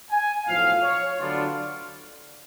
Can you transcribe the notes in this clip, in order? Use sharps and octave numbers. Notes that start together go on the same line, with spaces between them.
G#5
B1 A2 F3 F5
C#5
D2 D3 F#3 B3 D4 F4